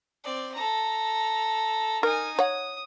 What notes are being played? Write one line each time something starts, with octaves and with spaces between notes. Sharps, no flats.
C4 D5
A4 A#5
D#4 A#4 G#5
C#5 F#5 D#6